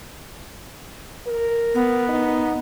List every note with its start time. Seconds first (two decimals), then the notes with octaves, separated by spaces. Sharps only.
1.27 A#4
1.74 B3
2.09 D#4